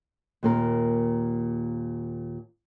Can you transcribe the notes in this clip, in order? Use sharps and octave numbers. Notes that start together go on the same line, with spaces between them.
D#2 A#2 A#4